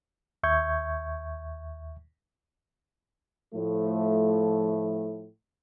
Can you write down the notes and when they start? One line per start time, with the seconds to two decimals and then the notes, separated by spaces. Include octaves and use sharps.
0.43 D#2 E5 C#6 G6 G#6
3.55 A2 F3 A3